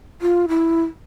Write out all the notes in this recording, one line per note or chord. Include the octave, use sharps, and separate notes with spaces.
F4
E4